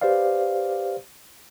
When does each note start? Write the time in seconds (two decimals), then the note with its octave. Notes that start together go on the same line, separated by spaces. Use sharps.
0.01 G4 B4 C5 D5 F5